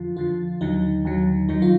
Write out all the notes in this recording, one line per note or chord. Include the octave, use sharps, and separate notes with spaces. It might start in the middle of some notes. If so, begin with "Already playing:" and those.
Already playing: F2 D3 F3 F4
F2 D3 F3 F4
D#2 D3 F#3 D#4
D#2 D3 F#3
F#2 D#3 F#3 D#4
F4